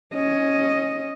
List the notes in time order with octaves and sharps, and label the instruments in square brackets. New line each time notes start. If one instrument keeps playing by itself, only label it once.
[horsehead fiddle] C#4 D#5